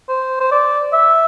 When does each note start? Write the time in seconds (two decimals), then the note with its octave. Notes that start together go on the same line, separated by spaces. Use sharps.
0.09 C5
0.41 C5
0.52 D5
0.93 E5